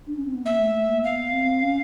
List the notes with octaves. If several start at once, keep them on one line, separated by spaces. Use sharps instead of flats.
D4
C#4
C4
B3
A#3 E5
A3
A3
A#3
B3 F5
C4
C#4